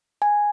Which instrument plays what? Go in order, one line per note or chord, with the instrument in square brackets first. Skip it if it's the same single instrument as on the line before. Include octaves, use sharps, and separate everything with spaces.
[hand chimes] G#5